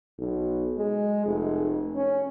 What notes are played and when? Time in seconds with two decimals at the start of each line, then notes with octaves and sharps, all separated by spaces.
0.19 B1
0.77 G#3
1.26 F1
1.95 C#4